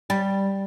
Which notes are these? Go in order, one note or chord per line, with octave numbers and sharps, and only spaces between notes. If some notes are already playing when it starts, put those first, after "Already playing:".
G3